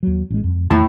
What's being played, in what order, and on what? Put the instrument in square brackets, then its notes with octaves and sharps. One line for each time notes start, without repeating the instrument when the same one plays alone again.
[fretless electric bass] D#2 F#3
A1 G#3
F2
[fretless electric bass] E2 D#3 E3 [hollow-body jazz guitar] A2 E4 A5